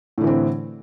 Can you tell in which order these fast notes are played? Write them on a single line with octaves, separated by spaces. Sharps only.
A2 D3 E3 C4